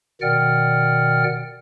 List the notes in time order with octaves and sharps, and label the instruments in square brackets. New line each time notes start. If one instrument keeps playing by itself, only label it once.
[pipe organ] B2 D#3 D5 F#5 G5 F6